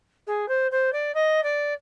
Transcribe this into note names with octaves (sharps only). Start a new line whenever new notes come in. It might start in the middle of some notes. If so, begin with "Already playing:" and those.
G#4
C5
C5
D5
D#5
D5